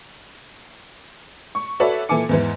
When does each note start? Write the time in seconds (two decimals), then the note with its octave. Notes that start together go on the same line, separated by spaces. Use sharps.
1.55 C#6
1.80 F#4 A4 B4 C#5 D5 E5
2.09 A#2 E3 A4 G#5 D6 C#7
2.29 E2 G#2 E3